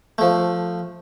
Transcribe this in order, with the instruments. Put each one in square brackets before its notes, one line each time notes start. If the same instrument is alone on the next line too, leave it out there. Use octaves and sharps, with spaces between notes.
[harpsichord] F3 A3